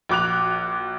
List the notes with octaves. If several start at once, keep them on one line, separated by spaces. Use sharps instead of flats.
A#1 F#4 D6 F#6 F7